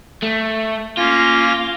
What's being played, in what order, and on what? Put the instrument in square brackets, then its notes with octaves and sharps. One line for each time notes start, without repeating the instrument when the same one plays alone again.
[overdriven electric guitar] A3
[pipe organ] A#3 C#4 A#6 [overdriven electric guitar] F4